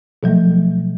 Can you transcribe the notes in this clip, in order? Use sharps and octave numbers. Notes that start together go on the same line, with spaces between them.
B2 F3 F#3 A3